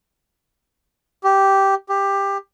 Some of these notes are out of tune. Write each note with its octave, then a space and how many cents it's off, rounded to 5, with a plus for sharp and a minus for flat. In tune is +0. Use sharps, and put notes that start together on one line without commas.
G4 -10
G4 +15